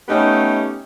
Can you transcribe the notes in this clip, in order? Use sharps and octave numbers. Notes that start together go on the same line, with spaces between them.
A3 B3 C#4 D#4 G4